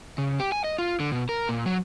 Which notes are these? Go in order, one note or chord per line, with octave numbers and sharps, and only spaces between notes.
C#3
G4
G#5
D#5
F4
D3
B2
A#4
A#2
F#3